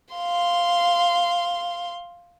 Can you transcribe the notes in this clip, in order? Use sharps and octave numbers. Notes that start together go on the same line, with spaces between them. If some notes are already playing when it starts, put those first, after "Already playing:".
F5 C6